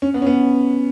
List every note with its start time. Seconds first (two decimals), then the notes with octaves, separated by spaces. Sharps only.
0.02 C#4
0.14 B3
0.22 C#4
0.27 B3